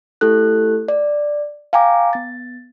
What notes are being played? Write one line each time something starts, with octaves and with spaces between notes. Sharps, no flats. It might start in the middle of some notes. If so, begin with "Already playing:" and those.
A3 E4 G4 A4 F#6
D5
F5 G5 G#5 A#5 D6
B3 A6